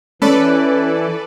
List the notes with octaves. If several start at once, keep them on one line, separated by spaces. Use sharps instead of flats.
E3 C#4 A4 B4 D5